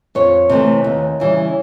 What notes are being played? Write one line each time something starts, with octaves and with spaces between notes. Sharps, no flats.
F2 C#5
C3 E3 A3
D#2
C#3 E3 G3